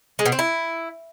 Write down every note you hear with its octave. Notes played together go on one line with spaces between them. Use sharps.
G#3
B2
C4
E4